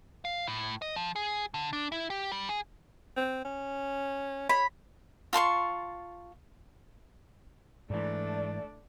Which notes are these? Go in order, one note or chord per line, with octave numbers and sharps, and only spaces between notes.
F5
A2
D#5
F3
G#4
D3
D4
E4
G4
G3
G#4
C4
C#4
C#5 B5
F4 A5 C6 C#6
G#2 E3 A3 D4 D5